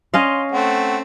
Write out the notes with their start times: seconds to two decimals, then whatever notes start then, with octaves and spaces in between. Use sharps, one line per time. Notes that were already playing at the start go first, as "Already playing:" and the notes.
0.14 C#4 D#5 F5 C6
0.52 A3 C4 F#5